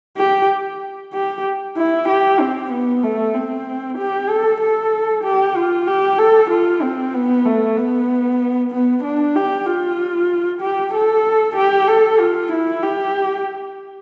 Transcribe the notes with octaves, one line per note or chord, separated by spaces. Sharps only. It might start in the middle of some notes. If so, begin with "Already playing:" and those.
G4
G4
E4
G4
C4
B3
A3
C4
G4
A4
A4
G4
F4
G4
A4
F4
C4
B3
A3
B3
B3
D4
G4
F4
G4
A4
G4
A4
F4
E4
G4